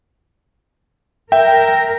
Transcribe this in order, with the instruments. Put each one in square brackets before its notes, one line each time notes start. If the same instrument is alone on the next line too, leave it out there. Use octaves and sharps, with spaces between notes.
[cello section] A#4 [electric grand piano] E5 G5